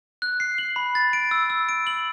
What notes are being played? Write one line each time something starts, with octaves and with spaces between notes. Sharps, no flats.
F#6
C7
F#7
B5
A6
D7
E6
E6
D7
F#7